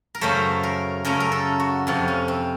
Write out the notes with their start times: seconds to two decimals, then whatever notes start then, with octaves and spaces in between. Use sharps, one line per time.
0.15 A#4
0.21 F#2 C#3 A3 C5
0.63 A#4
1.04 F#2 C#3 A3 A#4
1.20 A#4
1.32 A4
1.60 F#4
1.87 F2 C3 F3 F4
2.08 C#4
2.28 C4